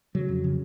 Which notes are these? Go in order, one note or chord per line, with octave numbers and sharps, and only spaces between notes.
C#3 F#3
F2
C#3